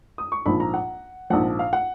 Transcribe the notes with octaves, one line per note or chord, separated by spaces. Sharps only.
D#6
C#6
A#1 G#2 F3 B5
A#5
F#5
A#1 G#2 F3 F#5
F5
F#5